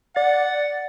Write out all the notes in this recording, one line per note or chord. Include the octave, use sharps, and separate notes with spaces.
D5 F#5 A6